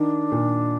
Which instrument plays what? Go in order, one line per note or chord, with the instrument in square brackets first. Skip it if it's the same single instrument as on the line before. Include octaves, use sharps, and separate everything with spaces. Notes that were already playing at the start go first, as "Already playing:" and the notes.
Already playing: [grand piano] D#3 [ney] D4
[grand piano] A#2